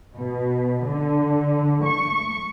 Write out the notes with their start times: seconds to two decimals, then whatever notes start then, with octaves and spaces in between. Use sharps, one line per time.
0.15 B2
0.85 D3
1.85 C#6